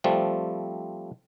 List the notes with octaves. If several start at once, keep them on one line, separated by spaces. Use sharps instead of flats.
F3 G3 A3 C4